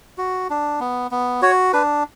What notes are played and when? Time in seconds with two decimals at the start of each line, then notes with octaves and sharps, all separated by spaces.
0.18 F#4
0.50 D4
0.80 B3
1.11 B3
1.42 F#4 C#5
1.73 D4 B4